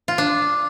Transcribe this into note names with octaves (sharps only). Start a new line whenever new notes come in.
F4
D4